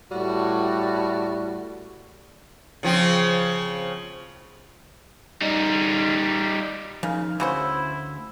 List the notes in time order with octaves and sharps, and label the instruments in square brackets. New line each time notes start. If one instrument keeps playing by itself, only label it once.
[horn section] A2 G3 F#4
[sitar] C#3 F3 C4
[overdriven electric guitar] G3 D#4
[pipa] C#3 [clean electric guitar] F3 D#4 A#4
[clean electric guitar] D2 B5 [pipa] C#3 F#4 C5 [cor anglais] E4